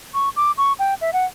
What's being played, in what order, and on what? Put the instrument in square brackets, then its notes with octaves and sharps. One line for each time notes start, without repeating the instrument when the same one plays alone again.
[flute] C#6
D6
C#6
G5
E5
F#5